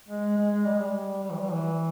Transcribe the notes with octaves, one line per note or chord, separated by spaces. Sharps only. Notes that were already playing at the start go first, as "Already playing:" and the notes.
G#3
G#3
G3
G#3
G3
G3
E3
G3
E3